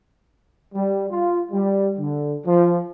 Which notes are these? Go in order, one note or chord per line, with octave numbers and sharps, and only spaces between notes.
G3
F4
G3
D3
F3